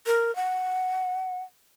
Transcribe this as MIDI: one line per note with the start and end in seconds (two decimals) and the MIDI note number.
0.06 0.34 70
0.36 1.42 78